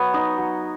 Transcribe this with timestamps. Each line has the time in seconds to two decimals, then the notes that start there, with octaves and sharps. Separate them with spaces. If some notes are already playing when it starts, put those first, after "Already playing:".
Already playing: F#3 B3 C#5
0.14 D#4 D#5
0.38 F#3